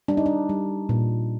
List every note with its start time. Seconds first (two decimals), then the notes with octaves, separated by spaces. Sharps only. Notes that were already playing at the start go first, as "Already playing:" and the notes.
0.08 G3 D4
0.17 D#4
0.26 D4
0.49 G3
0.89 A#2